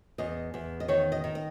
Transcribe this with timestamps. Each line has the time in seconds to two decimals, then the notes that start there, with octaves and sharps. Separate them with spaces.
0.18 E2 D#5
0.54 E2
0.80 D#5
0.88 D#3 C#5
1.12 D#5
1.24 D#3
1.35 D#5